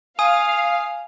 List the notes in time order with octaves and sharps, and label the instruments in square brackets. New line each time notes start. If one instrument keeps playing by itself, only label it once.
[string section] F5 [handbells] G#5 D#6